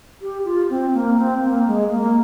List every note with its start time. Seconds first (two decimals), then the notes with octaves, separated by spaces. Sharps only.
0.22 G4
0.45 F4
0.70 C4
0.94 A#3
1.17 C4
1.43 A#3
1.67 G#3
1.91 A#3